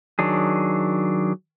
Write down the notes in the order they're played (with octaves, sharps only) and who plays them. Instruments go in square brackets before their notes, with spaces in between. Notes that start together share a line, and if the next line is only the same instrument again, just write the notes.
[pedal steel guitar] D#3 F#3 D4 G#4